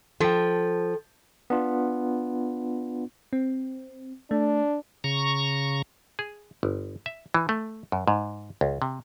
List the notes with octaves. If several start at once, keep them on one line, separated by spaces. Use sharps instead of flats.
F3 A4 G5
B3 D4 F4
C4
A3 D4
C#3 A#5 C#6
G#4
G1
E5
E3
A3
F#2
G#2
C#2
C3